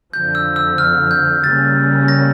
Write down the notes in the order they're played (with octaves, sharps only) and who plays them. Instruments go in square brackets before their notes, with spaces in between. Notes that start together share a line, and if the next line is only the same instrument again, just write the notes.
[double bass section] F2 D3 F3 [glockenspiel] G6
[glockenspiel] E6
E6
F6
G6
[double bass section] C#3 G3 A#3 C#4 [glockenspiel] A6
[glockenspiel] A#6